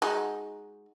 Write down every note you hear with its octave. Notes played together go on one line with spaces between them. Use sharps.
G#3 D#4 F#4